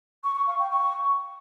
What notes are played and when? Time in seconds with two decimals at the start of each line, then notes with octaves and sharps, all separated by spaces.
0.24 C#6
0.35 C#6
0.47 F5
0.59 G5
0.70 C#6